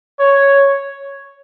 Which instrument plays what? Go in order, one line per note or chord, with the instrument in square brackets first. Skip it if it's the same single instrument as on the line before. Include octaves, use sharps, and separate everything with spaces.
[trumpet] C#5